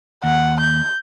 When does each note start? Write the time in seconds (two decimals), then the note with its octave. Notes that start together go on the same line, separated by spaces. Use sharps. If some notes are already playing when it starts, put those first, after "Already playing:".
0.24 D#2 F#5
0.60 G6